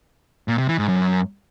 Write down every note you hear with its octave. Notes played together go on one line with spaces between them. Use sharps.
A#2
C3
E3
G#2
F#2